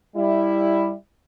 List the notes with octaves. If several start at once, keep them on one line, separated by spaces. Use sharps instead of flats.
G3 E4